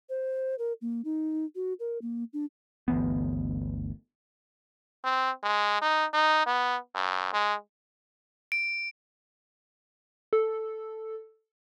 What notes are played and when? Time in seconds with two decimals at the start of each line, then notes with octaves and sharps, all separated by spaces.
0.09 C5
0.59 A#4
0.82 A#3
1.05 D#4
1.55 F#4
1.80 A#4
2.02 A#3
2.33 D4
2.88 G1 D2 E3 B3
5.04 C4
5.43 G#3
5.82 D#4
6.14 D#4
6.46 B3
6.95 F#2
7.33 G#3
8.52 D7
10.33 A4